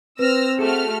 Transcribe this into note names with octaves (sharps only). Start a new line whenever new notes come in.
C4 B4 E6 F6 A#6
A3 F#4 G#4 A4 F6 E7